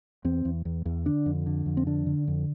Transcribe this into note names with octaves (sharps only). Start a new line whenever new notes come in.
E2 C4
E2
E2
E2
D3 D4
F2
D3
F2
C4
D3 D4
D3
F2